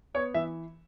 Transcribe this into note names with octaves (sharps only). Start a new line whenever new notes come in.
B3 C#5
E3 E5